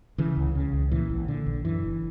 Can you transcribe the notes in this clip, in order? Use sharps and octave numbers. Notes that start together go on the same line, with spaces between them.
C#3 E3
C#2
C#3
C#2
A#2 E3
A#1
A#2 D3
A#1
F#2 E3
F#1